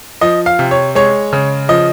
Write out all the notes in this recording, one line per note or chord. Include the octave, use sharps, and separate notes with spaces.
F3 D#5
F5
C3
C#5
G#3 C#5
C#3
F3 D#5